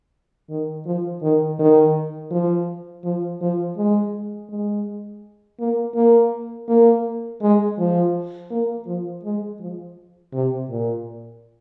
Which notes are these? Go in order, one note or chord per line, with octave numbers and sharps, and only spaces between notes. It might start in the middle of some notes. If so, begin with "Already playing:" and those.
D#3
F3
D#3
D#3
F3
F3
F3
G#3
G#3
A#3
A#3
A#3
G#3
F3
A#3
F3
G#3
F3
C3
A#2